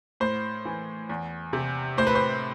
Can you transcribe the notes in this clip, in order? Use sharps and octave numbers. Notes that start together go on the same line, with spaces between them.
A2 C5
E3
E2
C3
A2 C5
B4
C5